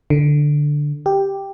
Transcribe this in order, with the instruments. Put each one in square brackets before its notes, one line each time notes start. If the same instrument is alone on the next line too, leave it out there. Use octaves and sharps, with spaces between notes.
[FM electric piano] D3
G4